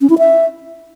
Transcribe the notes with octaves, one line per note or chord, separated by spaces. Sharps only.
C#4
E4
E5